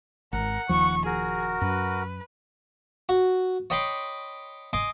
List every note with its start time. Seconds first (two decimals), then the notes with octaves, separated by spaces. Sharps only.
0.33 G#1 A#4 F#5
0.69 D#1 D#2 F3 C#6
1.06 F#4 G#4 A#4
1.61 F#2 B4
3.09 F#4
3.70 C#5 D#5 G5 B5 C6 D6
4.73 D#5 G#5 C6 D6